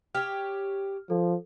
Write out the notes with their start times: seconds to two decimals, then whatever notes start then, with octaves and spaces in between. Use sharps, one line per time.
0.15 G4 C#5 F6
1.10 F3 A4